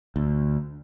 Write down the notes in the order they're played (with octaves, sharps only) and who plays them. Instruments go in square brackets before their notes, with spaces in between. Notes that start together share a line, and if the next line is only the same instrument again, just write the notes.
[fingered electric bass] D2